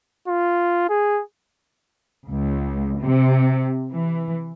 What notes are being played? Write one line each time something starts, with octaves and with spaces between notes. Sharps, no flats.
F4
G#4
C#2
C3
E3